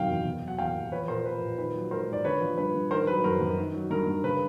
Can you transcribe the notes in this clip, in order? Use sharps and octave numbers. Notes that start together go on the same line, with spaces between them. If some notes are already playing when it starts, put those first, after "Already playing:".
Already playing: F#2 C3 D#3 F#3 F5 G5
E2
B2
F#3
F#5
E2 F5 G5
E2
F3 B4 C#5
A#2 A#4 C5
F3 B4
A#2
D#3 B4
F#3
G#2 A#4 C5
G#2 D5
D3 B4 C#5
F3
G2 B4
G2
D#3 A#4 C5
F#3 B4
F#2 A#4 C5
F#2
D#3
F#3
G2 A#4
G2
C#3 B4